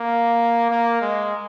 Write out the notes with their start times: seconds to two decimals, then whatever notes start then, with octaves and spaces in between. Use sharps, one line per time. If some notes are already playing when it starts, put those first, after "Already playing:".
Already playing: A#3
0.71 A#3
1.01 G#3